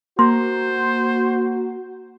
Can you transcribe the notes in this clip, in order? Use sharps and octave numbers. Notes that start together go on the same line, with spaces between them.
A#3 F#4 C5 C6